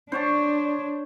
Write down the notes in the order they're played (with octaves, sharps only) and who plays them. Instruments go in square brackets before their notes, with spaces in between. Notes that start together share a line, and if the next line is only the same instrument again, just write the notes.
[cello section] D4 [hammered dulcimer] C5 C#5 A5